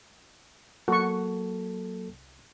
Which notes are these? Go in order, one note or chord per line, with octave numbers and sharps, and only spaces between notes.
F#3 A#3 F#4 A4 C#6
C2